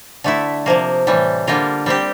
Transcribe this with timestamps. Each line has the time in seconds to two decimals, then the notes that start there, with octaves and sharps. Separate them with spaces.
0.24 D3 A3 E4
0.66 C3 F3 A#3
1.07 A2 E3 G3
1.47 D3 G3 A#3 F4 A#4
1.86 G3 C4 G4